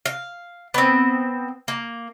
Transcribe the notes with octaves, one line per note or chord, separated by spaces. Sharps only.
F5
B3 C4
A#3